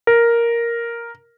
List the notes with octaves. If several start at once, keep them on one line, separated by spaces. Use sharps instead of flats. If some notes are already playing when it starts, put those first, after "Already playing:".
A#4